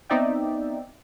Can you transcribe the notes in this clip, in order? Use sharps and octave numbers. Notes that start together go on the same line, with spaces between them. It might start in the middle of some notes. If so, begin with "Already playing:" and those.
B3 C4 D#4 D5 E5 G5